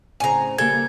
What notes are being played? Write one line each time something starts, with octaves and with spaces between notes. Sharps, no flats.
A2 C#3 C4 G#5 A#5
C#3 G3 A#3 A4 G#6